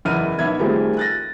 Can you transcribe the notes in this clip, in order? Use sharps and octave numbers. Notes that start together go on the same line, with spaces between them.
F#1 E2 E4 F6 D#7
B1 B3 E5 G#6
D#3 F3 G3 A3 C4 G#4
F#6 A6 A#6